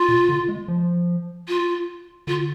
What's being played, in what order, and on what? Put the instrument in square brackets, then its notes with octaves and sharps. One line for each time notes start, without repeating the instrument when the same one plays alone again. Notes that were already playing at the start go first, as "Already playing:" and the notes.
Already playing: [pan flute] F4
[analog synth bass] B2
D3
G#3
F3
[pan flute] F4
[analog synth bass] D3 [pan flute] F4